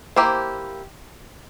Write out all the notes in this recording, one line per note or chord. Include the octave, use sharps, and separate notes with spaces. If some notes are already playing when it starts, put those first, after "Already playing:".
A#3 E4 G4 C5